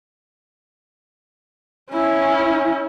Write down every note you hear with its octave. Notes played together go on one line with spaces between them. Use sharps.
C#4 E4